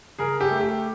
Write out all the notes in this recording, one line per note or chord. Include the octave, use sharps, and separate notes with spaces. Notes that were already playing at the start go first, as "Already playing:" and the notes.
C#3 G#4 A#4
G4 A4
A3
G4